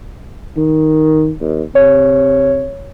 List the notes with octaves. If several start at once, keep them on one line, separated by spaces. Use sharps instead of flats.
D#3
D#2
C3 C#5